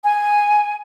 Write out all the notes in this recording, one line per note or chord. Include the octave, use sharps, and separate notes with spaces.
G#5